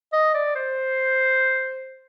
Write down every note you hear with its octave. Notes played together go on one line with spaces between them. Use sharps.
D#5
D5
C5